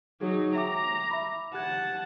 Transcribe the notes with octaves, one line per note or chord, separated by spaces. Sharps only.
F#3 D#4 G#4
E5 G5 A#5 D6
E5 B5 D6
G4 F#5 A5 F#6 G#6